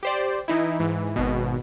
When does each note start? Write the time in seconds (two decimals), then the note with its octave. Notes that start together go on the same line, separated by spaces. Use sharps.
0.03 G4 C5 D5
0.48 E3 D#4 E4
0.79 G#2 E3
1.16 G#1 B2